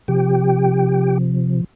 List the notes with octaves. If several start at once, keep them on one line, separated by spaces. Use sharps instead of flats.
C3 F3 G4 G5